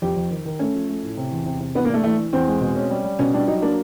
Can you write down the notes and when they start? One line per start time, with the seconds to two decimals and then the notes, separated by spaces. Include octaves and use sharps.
0.02 F2 G4
0.16 F2
0.31 D#3
0.45 D#3
0.59 A3 C#4
0.75 F3
0.89 A3
1.03 A2
1.17 C3
1.32 E2
1.46 C3
1.61 C3
1.75 E3 B3
1.85 A#3
1.89 A3 D4
2.04 E3 A3
2.18 E3
2.33 E2 C4
2.48 G#3
2.61 B2
2.76 C#4
2.90 G3
3.04 G3
3.19 B2 C#4
3.34 G3 D4
3.48 F#3 D#4
3.62 A#3 D4